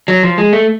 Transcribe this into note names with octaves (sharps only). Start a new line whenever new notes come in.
F#3
F3
G#3
A3